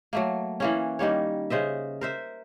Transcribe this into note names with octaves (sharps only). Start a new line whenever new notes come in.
F#3 A3 A#3
E3 A#3 C#4
D#3 G3 A#3 C#5
C#3 C5 D#5 E5
A#4 C5 E5